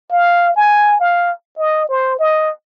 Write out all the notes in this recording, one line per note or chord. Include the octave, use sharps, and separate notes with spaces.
F5
G#5
F5
D#5
C5
D#5